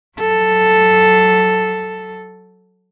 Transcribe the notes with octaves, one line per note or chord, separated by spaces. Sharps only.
F#3 A4